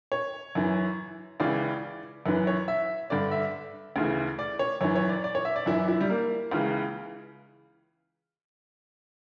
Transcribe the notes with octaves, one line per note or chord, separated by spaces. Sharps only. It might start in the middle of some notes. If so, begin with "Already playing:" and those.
C#5
F#2 E3
C#2 C#3 E3 D5
F#2 E3 B4
C#5
E5
G2 D3 D5
E5
D2 C#3 E3
D5
C#5
F#2 E3 C#5
C#5
D5
D5
C#5
E5
D5
F#2 E3 E4
E4
G3
A#3
C#2 C#3 E3